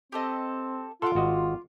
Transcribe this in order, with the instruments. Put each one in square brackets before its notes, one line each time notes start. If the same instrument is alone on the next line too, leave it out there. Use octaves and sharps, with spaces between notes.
[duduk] C4 [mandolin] G4 A4 D#5
[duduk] F4 [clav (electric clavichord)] A4 F5 F#5 [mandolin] C6 D6
[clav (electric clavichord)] G#1 F#4 D#5